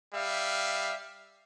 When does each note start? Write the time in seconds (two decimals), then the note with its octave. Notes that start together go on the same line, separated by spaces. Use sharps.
0.14 G3 E5 F5